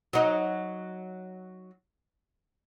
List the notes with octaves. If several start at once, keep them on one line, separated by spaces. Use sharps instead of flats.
F#3 D#4